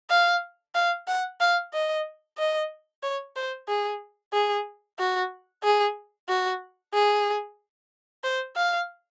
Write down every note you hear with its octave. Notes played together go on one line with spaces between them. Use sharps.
F5
F5
F#5
F5
D#5
D#5
C#5
C5
G#4
G#4
F#4
G#4
F#4
G#4
C5
F5